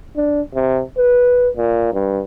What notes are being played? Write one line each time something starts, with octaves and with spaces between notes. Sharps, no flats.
D4
C3
B4
A#2
G2